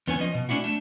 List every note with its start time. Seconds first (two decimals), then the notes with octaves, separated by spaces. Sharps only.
0.07 E2 B3 C#4 B4 G#5
0.20 F3 C#4 D#5
0.34 B2
0.49 A3 C#4 D4 E4 F#4
0.64 A3 D4